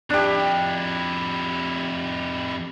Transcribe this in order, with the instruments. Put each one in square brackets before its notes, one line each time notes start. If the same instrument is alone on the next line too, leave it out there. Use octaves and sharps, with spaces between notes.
[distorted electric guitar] F2 E4 [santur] D4 G4